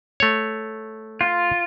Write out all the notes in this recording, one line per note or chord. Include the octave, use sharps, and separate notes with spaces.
A3 C#5
F4